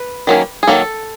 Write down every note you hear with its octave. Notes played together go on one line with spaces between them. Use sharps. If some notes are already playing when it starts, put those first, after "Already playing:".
Already playing: B4
D#3 F#3 A#3 C#4
G#4
D#3 F#3 A#3 A4